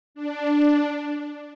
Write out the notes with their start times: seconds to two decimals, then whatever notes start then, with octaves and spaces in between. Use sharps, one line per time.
0.15 D4